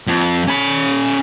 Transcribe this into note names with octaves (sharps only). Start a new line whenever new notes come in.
F2
C#4 B5